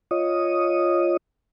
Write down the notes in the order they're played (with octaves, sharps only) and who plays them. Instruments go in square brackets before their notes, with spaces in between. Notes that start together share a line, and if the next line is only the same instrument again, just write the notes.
[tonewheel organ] F4 C#5 D#5 D#6